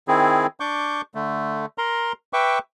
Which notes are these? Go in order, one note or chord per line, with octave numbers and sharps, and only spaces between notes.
D#3 C4 E4 G#4
D4 C#6 D6 G6
D3 A3
A#4 A#5 C6
B4 E5 G5 C#6 D6